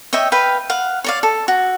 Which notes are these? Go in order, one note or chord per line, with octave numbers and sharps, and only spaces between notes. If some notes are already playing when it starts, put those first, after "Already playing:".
C#5 D#5 E5 G5
B4 F5 G5
F5 F#5
C#5 D5 F5
A4
F#4